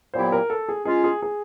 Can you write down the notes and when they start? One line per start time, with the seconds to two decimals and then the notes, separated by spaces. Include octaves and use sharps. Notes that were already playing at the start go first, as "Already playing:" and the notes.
0.14 A#2 F#3 B3 E4 G4 C5
0.32 A#4
0.50 A4
0.69 G#4
0.85 G#3 C#4 F4 G#4
1.04 G#4
1.22 G#4